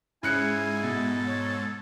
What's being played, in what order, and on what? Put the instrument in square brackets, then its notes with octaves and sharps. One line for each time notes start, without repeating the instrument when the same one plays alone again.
[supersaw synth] G#2 [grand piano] C#3 F#6 C#7 [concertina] E4 [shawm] G#5
[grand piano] B2 [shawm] A4
[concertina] C#5